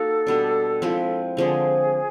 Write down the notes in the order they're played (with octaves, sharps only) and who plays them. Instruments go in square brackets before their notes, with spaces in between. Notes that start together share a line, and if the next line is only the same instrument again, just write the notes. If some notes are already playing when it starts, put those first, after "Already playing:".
Already playing: [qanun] A#3 D#4 F#4 [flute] A4
[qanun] B2 G3 B3 D4
F3 G#3 C4 E4
[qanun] D3 F3 G#3 C4 [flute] G#4